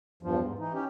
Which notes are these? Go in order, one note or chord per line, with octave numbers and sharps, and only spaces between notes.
E2 G2 F3
G#2
E3 D#4
C#4 G4